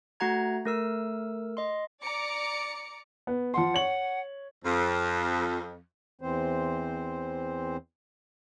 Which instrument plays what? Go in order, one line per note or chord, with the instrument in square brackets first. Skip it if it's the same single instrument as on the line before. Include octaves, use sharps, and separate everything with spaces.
[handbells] A3 F#4 F#5 A#5 G#6
A3 A#4 E6
D#5 C6
[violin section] D5 A#5 D6 C#7
[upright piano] B3
[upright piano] F3 C6 [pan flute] F#5
[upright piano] C#5 F#7
[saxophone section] F2
[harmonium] E2 E3 C4 C5